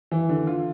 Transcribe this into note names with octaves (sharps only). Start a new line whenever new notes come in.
E3
D3
F4